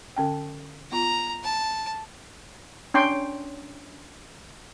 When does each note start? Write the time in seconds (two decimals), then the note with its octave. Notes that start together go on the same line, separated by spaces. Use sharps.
0.16 D3 C#4 G5
0.92 B3 F4 A#5
1.43 A5
2.94 C#4 D4 G5 C6 C#6